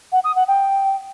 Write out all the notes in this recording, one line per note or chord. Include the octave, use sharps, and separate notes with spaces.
F#5
D#6
F#5
G5